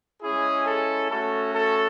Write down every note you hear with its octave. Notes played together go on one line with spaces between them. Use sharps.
G#3 C#4 E4 G#4
A4
A3 C#4 F#4 A4
A4